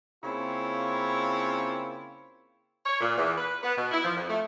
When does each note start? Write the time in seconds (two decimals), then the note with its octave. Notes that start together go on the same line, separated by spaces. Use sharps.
0.23 C#3 A#3 C4 E4 F4 C#5
2.86 C#5
3.01 A#2
3.17 E2
3.38 B4
3.63 B3
3.78 B2
3.92 E4
4.04 F3
4.16 F2
4.29 A3